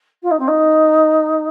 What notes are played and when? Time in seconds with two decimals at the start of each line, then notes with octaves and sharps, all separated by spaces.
0.23 F4
0.31 D#4
0.39 C4
0.48 D#4